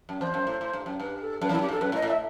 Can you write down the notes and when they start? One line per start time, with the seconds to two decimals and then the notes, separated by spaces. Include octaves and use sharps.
0.09 F#2
0.20 E2 C5
0.34 F#2
0.47 A2
0.61 A2
0.73 G2
0.86 F#2
1.00 G2 B4
1.21 A4
1.42 F#2 B4
1.49 E2 E4
1.55 F#2
1.62 G4
1.69 G2 A4
1.81 F#2 B4
1.92 A2
1.95 D#5
2.02 A2
2.08 E5